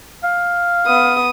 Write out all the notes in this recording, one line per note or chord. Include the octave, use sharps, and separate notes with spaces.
F5
B3 D#6